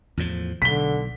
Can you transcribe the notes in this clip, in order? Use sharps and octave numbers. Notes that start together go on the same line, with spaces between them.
E2 A2 F3
B1 D3 B6 G7